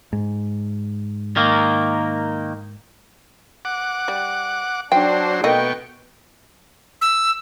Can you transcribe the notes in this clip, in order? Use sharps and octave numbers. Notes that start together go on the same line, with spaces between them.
G#2
D#3 A#3
F#5 D6
G3
F#3 D4 C5 G5
B2 A3 A#3 D#5 G5 C#6
E6